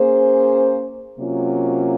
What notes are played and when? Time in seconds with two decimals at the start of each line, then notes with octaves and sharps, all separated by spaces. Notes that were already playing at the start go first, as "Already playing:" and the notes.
Already playing: A#3 C#4 G#4 C5
1.19 C3 F#3 A#3 C#4 F4